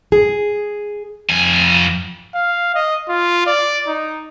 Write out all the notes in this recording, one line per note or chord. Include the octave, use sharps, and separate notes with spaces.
G#4
F2 G#5
F5
D#5
F4
D5
D#4